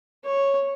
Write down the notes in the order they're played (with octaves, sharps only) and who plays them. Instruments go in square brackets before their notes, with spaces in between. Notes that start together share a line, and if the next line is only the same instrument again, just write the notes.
[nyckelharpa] C#5